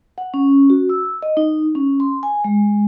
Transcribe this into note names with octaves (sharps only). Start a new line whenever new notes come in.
F#5
C#4
F#4
E6
D#5
D#4
C#4
C6
G#5
G#3